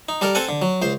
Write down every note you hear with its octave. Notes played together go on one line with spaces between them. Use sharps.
D#4
G3 A4 A#4
C4 A4 F#5 G#5
D3
F#3
C#2 C5